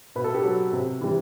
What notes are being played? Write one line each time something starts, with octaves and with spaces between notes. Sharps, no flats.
B2 B4
A4
G4
F#3 A4
C3
E3 G3